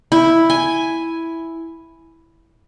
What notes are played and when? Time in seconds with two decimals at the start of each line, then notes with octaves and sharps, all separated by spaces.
0.12 E4
0.50 G#5